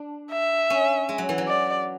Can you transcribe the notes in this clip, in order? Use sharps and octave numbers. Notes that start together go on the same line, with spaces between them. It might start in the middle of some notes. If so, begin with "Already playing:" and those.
Already playing: D4
E5
C#4
G#3
F#3
E3
F#3
D5